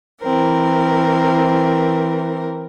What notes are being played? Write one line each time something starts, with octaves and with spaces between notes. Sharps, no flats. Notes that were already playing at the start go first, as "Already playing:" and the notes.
E3 C4 A#4